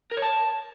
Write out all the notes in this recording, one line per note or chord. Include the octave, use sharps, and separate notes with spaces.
A#4
C#5
A5